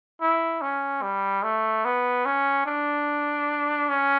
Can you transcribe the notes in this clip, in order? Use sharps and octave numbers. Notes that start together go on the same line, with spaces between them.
E4
C#4
G3
A3
B3
C#4
D4
C#4